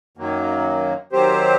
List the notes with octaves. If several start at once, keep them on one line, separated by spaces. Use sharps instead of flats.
F#2 D#3 F#3 A#3
D#3 F#3 C4 G4 C5